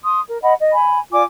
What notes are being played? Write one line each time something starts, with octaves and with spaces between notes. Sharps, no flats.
C6 D#6
A#4
D#5 F#5 B5
D#5
G#5 B5
F4 D5 G#5 D6